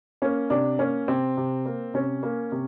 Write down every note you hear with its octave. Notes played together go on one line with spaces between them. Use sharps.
A#3 C#4
C3 D4
A#3 C#4
C3 C4
C3
A#3
C3 C#4
A#3
C3